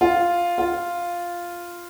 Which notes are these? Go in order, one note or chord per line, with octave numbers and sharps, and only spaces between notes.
F4
F4